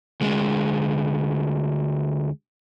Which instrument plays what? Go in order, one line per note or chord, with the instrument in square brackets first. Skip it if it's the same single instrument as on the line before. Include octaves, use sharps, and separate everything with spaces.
[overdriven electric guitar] D2 G#3